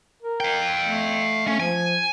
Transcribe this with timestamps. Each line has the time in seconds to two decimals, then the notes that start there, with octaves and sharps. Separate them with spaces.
0.22 A#4
0.40 F5 G5
0.85 A3
1.47 A3 C#4
1.60 F3 G#5